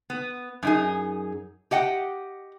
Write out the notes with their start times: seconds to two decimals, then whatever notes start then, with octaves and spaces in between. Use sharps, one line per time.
0.10 B3
0.63 F#2 D#4 G#4
1.71 G4 D#5 F#5 G5